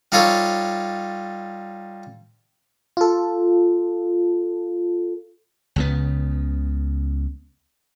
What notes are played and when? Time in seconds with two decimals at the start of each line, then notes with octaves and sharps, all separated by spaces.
0.12 G3 D#4 F4 A4 C#5
2.97 F4 A4
5.76 C#2 C#3 B3